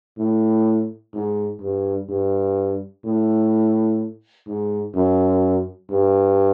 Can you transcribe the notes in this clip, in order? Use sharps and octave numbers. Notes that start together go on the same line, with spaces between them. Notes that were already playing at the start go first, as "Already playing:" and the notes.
A2
G#2
G2
G2
A2
G#2
F#2
G2